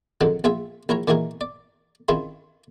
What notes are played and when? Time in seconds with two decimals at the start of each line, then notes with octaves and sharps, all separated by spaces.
0.21 F2 G#2 D3 D#3 F#3
0.44 A#1 F4 G#4 E5
0.89 A#1 E4 A#4 C#5 A#5
1.08 A#2 D#3 E3 F#4 G#4 A#4
1.41 D5
2.09 D#3 C4 C#4 E4 F4 G#4